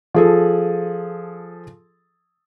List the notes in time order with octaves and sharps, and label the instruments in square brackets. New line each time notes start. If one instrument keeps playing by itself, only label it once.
[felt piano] F3 G#4 A4